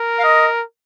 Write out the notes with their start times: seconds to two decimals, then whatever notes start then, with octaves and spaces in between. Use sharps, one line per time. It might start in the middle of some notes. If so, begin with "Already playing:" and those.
Already playing: A#4
0.19 F5
0.24 D#5